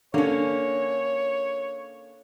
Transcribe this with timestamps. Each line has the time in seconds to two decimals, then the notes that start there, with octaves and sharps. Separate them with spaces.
0.14 D3 A#3 C#4 C#5